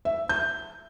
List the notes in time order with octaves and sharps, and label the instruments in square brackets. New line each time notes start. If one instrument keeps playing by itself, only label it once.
[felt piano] E5
G6